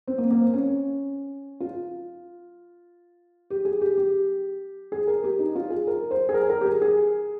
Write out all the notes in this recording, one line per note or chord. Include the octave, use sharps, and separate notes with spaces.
C4
A#3
A#3
C4
C#4
F4
G4
G#4
G4
G4
G#4
A#4
G4
D#4
F4
G#4
A#4
C5
G#4
A#4
A#4
G4
G#4
G#4